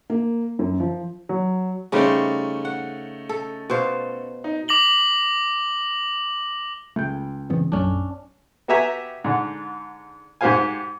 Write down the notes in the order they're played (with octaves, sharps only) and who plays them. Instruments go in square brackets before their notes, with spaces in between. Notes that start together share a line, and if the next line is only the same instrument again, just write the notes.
[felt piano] A#3
F#2
F3
[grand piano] F#3
[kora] C#3 G3 C5 [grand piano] A3 C#4 D#4
[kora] F#5
A4
B2 C5 F5
[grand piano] D#4
[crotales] D6 A#6 F#7 G7
[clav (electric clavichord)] C#2 G5 [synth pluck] A3
[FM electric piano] G#2 C#3 [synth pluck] E3 B3 C4
[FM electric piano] A#1 F#2 [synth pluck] F#3 A3 [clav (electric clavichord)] C#4 D4
[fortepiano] B3 F#4 G4 E5 G#5 A#5
G#2 D3
G#2 F#4 G4 C5 F5 G#5